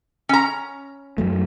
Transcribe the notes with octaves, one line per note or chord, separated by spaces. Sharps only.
C#4 A#5
F#2 F#3 A3